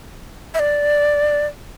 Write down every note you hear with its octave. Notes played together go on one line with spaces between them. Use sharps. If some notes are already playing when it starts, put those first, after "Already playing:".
E5
D5